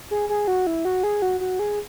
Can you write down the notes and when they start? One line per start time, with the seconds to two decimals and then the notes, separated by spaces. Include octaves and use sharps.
0.11 G#4
0.29 G#4
0.48 F#4
0.67 E4
0.85 F#4
1.03 G#4
1.22 F#4
1.40 F#4
1.59 G#4